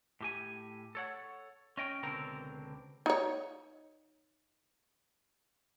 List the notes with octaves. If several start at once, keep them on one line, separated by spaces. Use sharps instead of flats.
A2 G4 G#5
A4 C#5 F#5
C#4 D#5 G5
C#2 B2 D3 C4 A#4
D#4 C#5